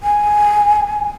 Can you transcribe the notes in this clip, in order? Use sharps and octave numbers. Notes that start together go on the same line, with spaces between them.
G#5